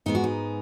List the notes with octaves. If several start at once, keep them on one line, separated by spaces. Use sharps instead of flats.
G#2 G#3 B3 D#4
F#4
D#4